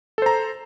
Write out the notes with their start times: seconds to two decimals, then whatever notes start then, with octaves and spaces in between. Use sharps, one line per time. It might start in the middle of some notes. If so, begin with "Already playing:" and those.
0.18 A4
0.22 C5
0.26 A#5